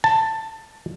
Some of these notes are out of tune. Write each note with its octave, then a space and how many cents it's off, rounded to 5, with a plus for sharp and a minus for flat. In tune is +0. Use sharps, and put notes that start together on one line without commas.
A5 +10